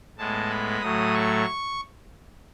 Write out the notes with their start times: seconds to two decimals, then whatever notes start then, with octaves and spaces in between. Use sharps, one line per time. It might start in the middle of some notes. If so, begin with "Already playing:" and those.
0.17 A2 G#3 B3 A5
0.50 B5
0.81 A2 F#3 A3 D#6
1.14 C#6